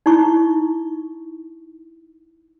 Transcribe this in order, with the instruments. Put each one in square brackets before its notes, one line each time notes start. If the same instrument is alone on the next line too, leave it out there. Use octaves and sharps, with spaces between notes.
[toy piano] D#4 E4 C#6